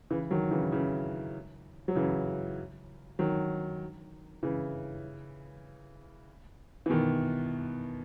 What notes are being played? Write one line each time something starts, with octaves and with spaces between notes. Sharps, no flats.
C#3 E3
D#3 F#3
C#3 E3
C#3 E3
F#3
C#3 E3
D#3 F#3
C#3 E3
E3
B2 D#3